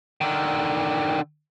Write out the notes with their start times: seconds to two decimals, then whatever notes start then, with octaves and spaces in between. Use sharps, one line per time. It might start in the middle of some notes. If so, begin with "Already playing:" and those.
0.21 D3 D#3